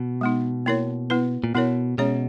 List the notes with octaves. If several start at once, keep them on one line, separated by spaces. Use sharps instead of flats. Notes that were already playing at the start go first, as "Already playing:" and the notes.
Already playing: B2
G#3 B3 D#4
A#3 E4 A#4 C#5
B3 E4 B4
A#2
B2 B3 E4 A#4 C#5
B2 G#3 C#4 G#4 C#5